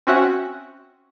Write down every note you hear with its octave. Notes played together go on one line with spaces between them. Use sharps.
C4 C#4 F#4 E5 F#5